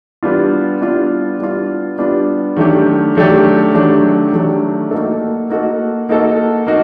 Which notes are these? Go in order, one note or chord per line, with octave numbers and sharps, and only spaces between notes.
G3 B3 D4 F4
G3 B3 D4 F4
G3 B3 D4 F4
G3 B3 D4 F4
D#3 F#3 A3 D4 G4
D#3 F#3 A3 D4 G4
D#3 F#3 A3 D4 G4
D#3 F#3 A3 D4 G4
A#3 D#4 F#4 A4
A#3 D#4 F#4 A4
A#3 D#4 F#4 A4
A#3 D#4 F#4